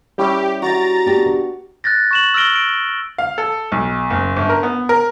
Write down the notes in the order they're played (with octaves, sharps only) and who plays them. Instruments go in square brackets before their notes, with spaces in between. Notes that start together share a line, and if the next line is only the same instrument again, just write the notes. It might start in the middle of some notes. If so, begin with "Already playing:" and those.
[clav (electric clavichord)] G3 C#4 E4 [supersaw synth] G4
[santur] F#4 G5 [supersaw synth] A#5 A6
[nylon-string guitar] B3 D4 G4
[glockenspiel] F#6 G6 A6 A#6
C#6 E7 F#7
E6 F6 A#6 D7 G7
D7
[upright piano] F5
A4
B1
F#1
G1
A#4
B3
A#4